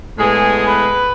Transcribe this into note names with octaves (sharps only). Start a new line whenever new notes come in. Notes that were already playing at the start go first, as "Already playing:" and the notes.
A2 G#3 B3 G#4
B4